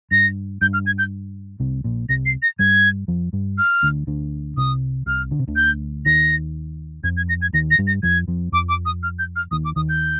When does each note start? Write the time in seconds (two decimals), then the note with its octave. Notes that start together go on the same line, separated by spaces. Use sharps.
0.11 G2 A#6
0.61 G2 G6
0.73 F6
0.86 G#6
0.98 G6
1.60 C2 C3
1.84 A#1 A#2
2.09 C2 C3 A#6
2.26 C7
2.42 A#6
2.59 G2 G3 G#6
3.08 F2 F3
3.33 G2 G3
3.58 F6
3.83 D2 D3
4.07 D2 D3
4.57 C2 C3 D#6
5.06 C2 C3 F6
5.31 D3
5.39 C3
5.48 D2 D3
5.56 G6
6.05 D#2 D#3 A#6
7.04 F2 F3 G#6
7.17 G#6
7.29 A#6
7.42 G#6
7.53 D#2 D#3 A#6
7.71 A#6
7.78 G2 G3
7.87 A#6
8.03 F2 F3 G#6
8.28 F2 F3
8.52 F2 F3 D6
8.69 D6
8.85 D#6
9.03 F6
9.19 G6
9.36 F6
9.51 D#2 D#3 D#6
9.65 D6
9.76 D#2 D#3 D#6
9.89 G6